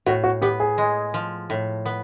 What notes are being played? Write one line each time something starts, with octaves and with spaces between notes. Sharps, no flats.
A2 F#4
F#4
B3 G4
G#4
G#3
F3
A2
B3